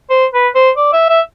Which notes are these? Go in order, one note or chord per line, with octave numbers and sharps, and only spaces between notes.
C5
B4
C5
D5
E5
E5